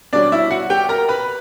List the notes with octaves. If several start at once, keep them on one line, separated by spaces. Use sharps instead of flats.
B2 G3 C#4 D4 D5
E4 E5
F#4 F#5
G4 G5
A#4 A#5
B4 B5